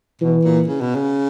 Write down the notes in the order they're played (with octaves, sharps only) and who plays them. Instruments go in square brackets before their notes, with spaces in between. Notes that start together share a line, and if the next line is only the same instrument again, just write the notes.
[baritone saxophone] B2 [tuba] E3
[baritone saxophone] A#2
C#3
B2
C#3